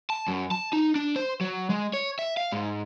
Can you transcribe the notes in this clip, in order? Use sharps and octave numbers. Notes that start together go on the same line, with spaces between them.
A5
F#2
A5
D#4
D4
C5
F#3
G#3
C#5
E5
F5
G#2